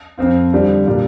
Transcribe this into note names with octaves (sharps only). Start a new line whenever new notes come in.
F2 F3 C4 F4
D3 G3 D4 F4
A#2 G3 D4 F4